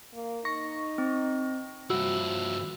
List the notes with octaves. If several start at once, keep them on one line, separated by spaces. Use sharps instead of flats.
A#3
D#4 C#6 A#6
C4
G2 F3 E4 F#4 E6